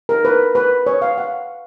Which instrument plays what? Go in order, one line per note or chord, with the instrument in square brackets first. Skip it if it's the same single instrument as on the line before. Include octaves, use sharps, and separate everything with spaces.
[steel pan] A#4
B4
B4
C#5
F5
F#5